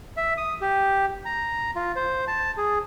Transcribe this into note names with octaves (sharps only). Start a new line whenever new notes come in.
E5
D#6
G4
A#5
F4
C5
A5
G#4